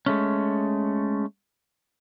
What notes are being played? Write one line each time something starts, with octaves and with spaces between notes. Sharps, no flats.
G#3 A3 C#4